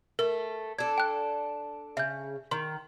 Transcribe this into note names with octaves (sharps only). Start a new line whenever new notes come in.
A3 A#4
D4 A4 G#6
G5 F#6
C#3 E5 G6
D#3 C6